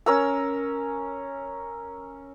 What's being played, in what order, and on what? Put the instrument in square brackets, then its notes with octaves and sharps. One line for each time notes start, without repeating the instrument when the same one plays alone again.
[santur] C#4 A#4 E6